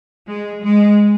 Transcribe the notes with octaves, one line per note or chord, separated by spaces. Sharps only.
G#3
G#3